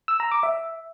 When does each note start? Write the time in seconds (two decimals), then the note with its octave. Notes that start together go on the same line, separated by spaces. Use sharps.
0.08 E6
0.20 A#5
0.32 D6
0.43 E5